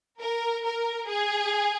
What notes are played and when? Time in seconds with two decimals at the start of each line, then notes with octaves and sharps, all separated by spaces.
0.20 A#4
0.65 A#4
1.09 G#4